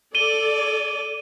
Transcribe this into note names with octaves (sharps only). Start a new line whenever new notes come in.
A4 D5 D#7 G7